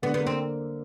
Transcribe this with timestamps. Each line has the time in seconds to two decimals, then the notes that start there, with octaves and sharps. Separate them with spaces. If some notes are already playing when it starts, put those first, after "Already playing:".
0.02 D3 B3
0.14 B3
0.21 A#3
0.27 C4